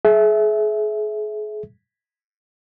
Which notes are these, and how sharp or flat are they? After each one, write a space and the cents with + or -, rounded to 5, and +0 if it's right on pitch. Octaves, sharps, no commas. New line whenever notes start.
G#4 +35 E5 -5